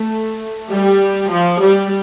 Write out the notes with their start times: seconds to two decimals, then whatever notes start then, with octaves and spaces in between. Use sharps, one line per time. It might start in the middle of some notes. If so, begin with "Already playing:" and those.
Already playing: A3
0.70 G3
1.31 F3
1.61 G3